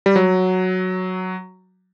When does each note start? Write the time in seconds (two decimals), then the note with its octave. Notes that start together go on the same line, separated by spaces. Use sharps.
0.06 G3
0.16 F#3